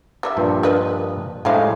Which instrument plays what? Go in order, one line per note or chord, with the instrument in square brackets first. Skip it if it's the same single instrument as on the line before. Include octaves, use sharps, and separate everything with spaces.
[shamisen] G3 A#4 E5
[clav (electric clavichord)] G2 A#2 F3
[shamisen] A#4 B4 D#5
[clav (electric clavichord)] A2 G#3 D#4 [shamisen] G3 C5 F5